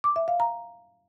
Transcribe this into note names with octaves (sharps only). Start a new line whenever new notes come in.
D6
E5
F5
A#5